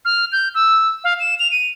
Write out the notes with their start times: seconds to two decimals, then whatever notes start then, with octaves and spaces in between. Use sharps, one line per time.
0.05 F6
0.32 G6
0.54 E6
1.04 F5
1.20 E7
1.39 F7
1.51 D#7